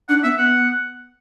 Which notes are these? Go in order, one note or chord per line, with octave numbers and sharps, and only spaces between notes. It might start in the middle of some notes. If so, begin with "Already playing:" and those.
D4 F#5
B3 E5
B3 F#5